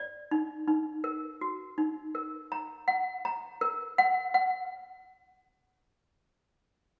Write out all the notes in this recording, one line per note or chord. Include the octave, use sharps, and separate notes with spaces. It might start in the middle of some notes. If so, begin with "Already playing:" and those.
Already playing: D5
D#4
D#4
A#4
F#4
D#4
A#4
A#5
F#5
A#5
A#4
F#5
F#5